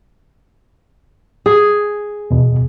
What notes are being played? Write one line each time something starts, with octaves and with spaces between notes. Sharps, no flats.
G#4
E2 B2